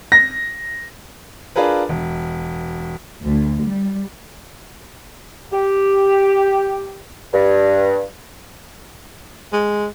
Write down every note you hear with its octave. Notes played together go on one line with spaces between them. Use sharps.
A#6
D4 F4 G#4 A#4 B4
E1
D2
G3
G4
G2
G#3